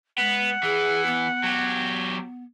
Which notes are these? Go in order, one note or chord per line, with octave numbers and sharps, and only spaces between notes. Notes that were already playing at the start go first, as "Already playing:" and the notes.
G#3 B3 F#5
E3 G#4
B3
F#3 G4